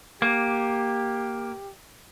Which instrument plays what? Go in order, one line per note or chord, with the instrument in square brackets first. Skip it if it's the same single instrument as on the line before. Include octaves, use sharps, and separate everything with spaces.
[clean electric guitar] A#3 [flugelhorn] G4